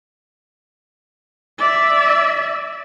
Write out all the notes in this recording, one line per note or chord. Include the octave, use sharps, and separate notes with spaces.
D5 E5